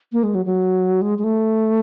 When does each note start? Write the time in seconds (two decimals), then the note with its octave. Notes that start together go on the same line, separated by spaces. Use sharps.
0.12 A#3
0.23 G#3
0.35 F#3
0.45 F#3
1.02 G#3
1.18 G#3
1.24 A3